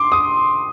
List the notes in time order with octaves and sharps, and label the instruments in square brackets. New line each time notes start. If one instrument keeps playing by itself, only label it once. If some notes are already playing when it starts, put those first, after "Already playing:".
Already playing: [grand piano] C6 D6
D#6